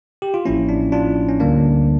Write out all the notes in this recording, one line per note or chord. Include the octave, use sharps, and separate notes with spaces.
G4
F4
A1 A2 F3 A#3 C#4 E4
D4
D4 F4
C#4
D2 D3 G3 A#3 D4